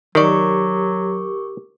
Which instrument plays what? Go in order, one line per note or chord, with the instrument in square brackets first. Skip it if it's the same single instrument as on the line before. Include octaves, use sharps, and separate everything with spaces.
[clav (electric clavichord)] D#3 D5 [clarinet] F#3 [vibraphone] G4 [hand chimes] A#4 C#6 D6